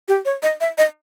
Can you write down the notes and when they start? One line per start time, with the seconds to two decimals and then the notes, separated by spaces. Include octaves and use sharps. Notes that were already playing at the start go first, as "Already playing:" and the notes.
0.08 G4
0.25 C#5
0.43 D#5
0.61 E5
0.78 D#5